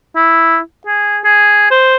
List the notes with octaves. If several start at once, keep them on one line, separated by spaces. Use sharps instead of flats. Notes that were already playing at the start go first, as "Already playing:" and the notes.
E4
G#4
G#4
C5